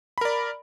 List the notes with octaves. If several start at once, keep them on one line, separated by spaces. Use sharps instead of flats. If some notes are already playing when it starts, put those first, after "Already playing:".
A#4 D5 B5